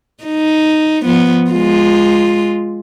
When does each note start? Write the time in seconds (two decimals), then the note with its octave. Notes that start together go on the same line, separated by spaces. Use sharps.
0.24 D#4
1.03 F3 B3
1.51 G#3 F4